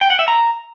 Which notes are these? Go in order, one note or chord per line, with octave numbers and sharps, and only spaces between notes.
G5
F#5
E5
A#5